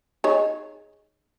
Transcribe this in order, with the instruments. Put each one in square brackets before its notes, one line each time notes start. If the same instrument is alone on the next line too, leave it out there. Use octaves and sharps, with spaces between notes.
[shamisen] D#4 G#4 C#5